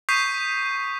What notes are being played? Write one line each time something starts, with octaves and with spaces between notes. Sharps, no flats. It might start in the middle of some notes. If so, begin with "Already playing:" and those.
C#6 D#6 G6 B6 C7 D#7